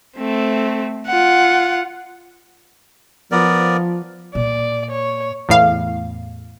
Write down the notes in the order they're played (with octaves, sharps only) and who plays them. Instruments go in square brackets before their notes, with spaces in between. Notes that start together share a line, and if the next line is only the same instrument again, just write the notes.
[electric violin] A3 C4
F4 F#5
[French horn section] F3 [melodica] B3 A#4 D5
[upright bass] A#2 [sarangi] D5
[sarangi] C#5
[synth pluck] E2 A2 F5